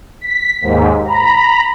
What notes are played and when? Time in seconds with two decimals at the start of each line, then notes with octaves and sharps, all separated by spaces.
0.21 B6
0.61 D#2 G#2
1.05 A#5 B5